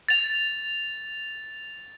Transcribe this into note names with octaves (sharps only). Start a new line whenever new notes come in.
A6 F7